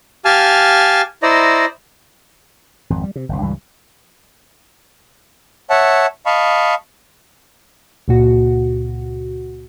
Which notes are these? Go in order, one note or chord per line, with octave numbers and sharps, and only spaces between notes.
G4 F5 G#5 A5 F6
E4 C5 D5 D#5 A#5
G#1 F2
G3
C3
G1 C2
C#2 G2 E3 G3
C#5 E5 F#5 A5
D#5 F5 A5 B5 C#6
C#2 A#2 F#4